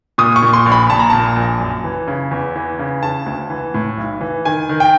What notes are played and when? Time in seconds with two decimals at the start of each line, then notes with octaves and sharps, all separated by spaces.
0.18 A#2 D#6
0.36 C#6
0.42 A#2
0.53 C6
0.66 A#1
0.72 B5
0.90 A#2 A5
0.99 A#5
1.10 A#2 A5
1.36 A#1
1.60 F#2
1.84 E3
2.08 C#3
2.31 E2
2.56 E3
2.79 C#3
3.02 C#3 A5
3.26 D2
3.50 E3
3.74 A2
3.98 B1
4.21 E3
4.45 D#3 G#5
4.69 D#3
4.80 G5